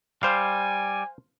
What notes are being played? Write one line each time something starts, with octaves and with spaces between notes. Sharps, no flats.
G3 C5 F5 G#5